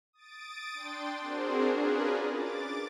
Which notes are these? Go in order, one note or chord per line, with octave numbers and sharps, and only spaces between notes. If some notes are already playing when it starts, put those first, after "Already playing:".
D#6 A6 D7
D4 G5 C6
C4 D4 F#4 G#4 A#4 C5
C#4 D4 F4 G#4 A#4 B4
D6 A6